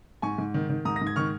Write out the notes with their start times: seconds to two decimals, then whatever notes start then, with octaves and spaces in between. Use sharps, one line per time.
0.22 G#2 G#5 C#6
0.38 G#2
0.54 D#3
0.70 D#3
0.85 G#2 A#5 D#6
0.96 A#6
1.02 G#2
1.07 G#6
1.16 D#3 C#6 F6